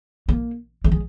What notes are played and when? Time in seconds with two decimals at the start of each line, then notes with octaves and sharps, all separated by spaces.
0.29 A#3
0.84 A3
0.92 G#3